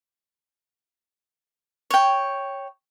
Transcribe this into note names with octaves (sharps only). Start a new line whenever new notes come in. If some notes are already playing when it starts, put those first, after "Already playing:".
C#5 G5